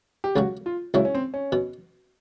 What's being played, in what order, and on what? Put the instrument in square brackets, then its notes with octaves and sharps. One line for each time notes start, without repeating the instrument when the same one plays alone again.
[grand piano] G4
[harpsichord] C#2 C#3 F#3 [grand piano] F#4
[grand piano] F4
[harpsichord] C#2 C#3 F#3 [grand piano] E4
[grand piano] C#4
C4
C#4
[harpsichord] B2